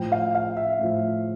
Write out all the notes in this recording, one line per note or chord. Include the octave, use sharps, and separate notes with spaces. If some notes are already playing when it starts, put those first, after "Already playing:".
Already playing: A2 F3 G5
F5
F5
E5
A2 F3